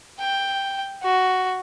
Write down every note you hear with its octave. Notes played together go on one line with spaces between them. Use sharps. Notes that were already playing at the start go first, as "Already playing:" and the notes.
G5
F#4